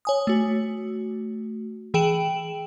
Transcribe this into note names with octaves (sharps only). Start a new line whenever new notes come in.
C#5 G#5 D#6
A3 F#4
E3 G#4 G5 D7 E7 F#7